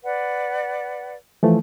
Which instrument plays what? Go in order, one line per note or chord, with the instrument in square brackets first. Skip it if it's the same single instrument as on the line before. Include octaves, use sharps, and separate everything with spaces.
[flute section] B4 D5 F#5
[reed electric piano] E3 F3 A3